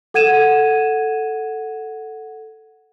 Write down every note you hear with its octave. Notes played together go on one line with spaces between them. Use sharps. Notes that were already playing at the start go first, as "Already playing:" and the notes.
A4 F#5 G#6 D#7 E7